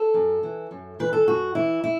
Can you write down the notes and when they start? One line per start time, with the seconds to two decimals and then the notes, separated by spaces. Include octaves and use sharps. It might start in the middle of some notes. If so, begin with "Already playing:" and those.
Already playing: A4
0.14 F#2
0.43 E3
0.71 F#2
0.99 E3 B4
1.13 A4
1.27 F#2 F#4
1.55 E3 E4
1.84 E4